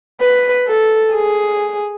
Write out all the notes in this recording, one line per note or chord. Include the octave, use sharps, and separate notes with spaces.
B4
A4
G#4